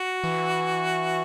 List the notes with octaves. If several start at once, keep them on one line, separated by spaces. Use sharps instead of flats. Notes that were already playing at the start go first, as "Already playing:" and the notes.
Already playing: F#4
E3